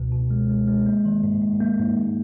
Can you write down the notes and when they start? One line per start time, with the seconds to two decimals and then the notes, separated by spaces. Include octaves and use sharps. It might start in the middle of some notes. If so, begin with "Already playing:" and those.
Already playing: C#2 B2
0.12 B2
0.31 G#3
0.49 G#3
0.68 G#3
0.86 A#3
1.05 D#3
1.24 G#2
1.42 G#2
1.60 A#3
1.79 G#2
1.97 G#2